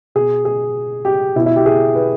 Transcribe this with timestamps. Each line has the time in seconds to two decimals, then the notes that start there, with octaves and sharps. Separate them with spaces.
0.15 B2 G#4
0.45 G#4
1.05 G4
1.36 B2 E4
1.46 E4
1.56 G4
1.66 G#4
1.95 B4